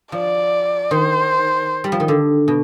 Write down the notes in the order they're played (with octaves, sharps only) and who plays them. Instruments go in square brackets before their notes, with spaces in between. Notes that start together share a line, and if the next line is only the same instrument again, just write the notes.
[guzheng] F3 [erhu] D5
[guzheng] D#3 [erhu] C5
[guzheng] G3
F3
D#3
D3
B2